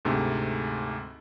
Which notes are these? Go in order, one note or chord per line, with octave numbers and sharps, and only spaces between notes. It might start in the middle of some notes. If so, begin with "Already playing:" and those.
D2 G#2 C3 A3